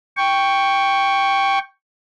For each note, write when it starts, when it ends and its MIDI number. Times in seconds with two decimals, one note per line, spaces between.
0.17 1.59 79
0.17 1.59 85